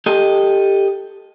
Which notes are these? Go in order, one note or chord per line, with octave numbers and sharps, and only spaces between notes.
G4 A4 D#5